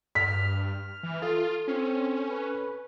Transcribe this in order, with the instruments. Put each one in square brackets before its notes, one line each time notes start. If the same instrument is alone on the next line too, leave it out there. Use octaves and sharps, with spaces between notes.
[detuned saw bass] G2 [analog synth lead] F6 [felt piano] B6
[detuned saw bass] E3
[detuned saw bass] F4 [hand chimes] A4
[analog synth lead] C4 [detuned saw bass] C#4
[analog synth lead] B4